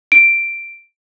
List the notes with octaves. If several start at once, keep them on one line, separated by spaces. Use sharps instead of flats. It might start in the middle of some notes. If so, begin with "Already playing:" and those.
D7